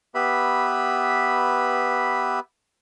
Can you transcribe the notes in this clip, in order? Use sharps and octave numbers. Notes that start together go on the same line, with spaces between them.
B3 G4 B4 E5 B5